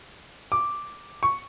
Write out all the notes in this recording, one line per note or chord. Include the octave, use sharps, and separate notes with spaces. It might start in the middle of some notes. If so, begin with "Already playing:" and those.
D6
C#6